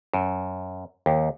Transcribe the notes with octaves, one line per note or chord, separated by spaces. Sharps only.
F#2
D#2